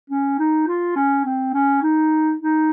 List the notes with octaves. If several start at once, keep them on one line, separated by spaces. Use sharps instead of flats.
C#4
D#4
F4
C#4
C4
C#4
D#4
D#4